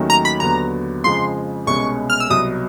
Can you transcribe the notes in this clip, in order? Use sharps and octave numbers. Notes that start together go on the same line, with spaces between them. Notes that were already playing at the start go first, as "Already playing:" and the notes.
Already playing: D#2 D#3 F#3 A3 C#4
A#5
B5
D#2 D3 F#3 B3 A#5
F2 C#3 F3 G#3 C6
C2 B2 G#3 C#4 C#6
F6
E6
C2 B2 F#3 D#6